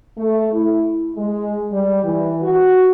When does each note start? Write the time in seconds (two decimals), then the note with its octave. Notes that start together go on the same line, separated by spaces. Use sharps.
0.18 A3
0.53 E4
1.16 G#3
1.72 G3
2.03 E3
2.42 F#4